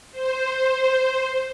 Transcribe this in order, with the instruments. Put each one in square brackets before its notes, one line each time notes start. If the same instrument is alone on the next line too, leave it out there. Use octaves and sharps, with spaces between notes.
[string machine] C5